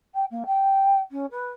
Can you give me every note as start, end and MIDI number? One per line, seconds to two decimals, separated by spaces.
0.14 0.24 79
0.30 0.43 58
0.46 0.99 79
1.11 1.25 61
1.31 1.50 71